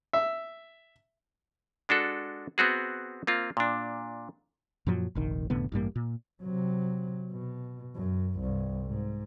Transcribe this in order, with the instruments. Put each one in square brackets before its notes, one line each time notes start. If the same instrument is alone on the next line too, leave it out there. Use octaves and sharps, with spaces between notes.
[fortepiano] E5
[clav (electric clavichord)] G#3 D4 F#4 A4
B3 C4 F#4 G#4
A#3 C4 F4
A#2 D4
[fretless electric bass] F#2 A#2 F3 F#3
F1 A#1 D#3
F1 A2 D3 B3
A1 G2 G3 A#3
A#2
[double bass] C3 F#3
B2
F#2
C2 G2
G#2